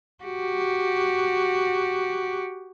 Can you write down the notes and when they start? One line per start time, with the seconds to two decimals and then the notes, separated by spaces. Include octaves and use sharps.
0.24 F#4 G4